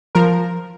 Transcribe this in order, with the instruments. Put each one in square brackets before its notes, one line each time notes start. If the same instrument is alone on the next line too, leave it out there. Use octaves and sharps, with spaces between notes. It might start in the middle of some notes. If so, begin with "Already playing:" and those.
[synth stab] F3 A#4